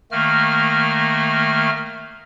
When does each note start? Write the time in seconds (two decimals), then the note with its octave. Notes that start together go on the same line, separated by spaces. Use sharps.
0.12 D#3 A3 A#3 F6